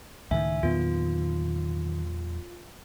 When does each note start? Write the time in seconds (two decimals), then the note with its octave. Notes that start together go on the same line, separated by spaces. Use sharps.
0.31 C#2 A2 D#3 E5 G#5
0.63 E2 A#2 D#3 F#3 B3 F4